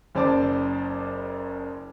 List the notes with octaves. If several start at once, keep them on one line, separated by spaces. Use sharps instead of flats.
F#1 C#3 C5 D5 A5 D6